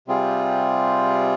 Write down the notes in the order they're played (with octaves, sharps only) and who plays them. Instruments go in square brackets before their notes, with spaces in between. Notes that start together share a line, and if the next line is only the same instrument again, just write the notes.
[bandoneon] C3 G3 C4 F4 G#4